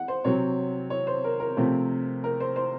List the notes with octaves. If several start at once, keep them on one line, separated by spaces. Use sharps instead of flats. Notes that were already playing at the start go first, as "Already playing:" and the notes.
Already playing: F#5
C5
C3 F#3 C4 C#5
C#5
C5
A#4
A#4
C3 F3 A3 C4
A#4
C5
C5